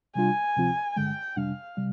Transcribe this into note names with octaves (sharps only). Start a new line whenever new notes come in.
C3 G3 D4 F4 G#5
D2 C3 F3 C4 F4
G2 D3 G#3 G5
F2 C3 G3 D4 F5
C3 G3